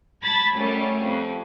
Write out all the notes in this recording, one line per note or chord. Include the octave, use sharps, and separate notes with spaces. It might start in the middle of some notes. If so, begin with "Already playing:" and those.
A5 B5 G#6 A6
F#2 G3 A3 C#4
F2